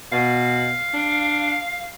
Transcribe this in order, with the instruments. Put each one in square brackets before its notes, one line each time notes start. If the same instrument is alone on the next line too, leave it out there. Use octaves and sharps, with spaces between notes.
[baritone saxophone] B2 [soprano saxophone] F5
[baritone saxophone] D4